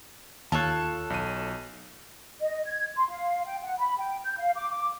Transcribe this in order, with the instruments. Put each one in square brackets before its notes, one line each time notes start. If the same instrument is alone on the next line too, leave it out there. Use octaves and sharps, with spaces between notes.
[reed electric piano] D#2 [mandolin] F4 A4 C#5 [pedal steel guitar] A5 F#6
[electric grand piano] B1 D#7
[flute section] D#5
G#6
C6
F5
G5
F#5
B5
G5
G6
F5
D6
D6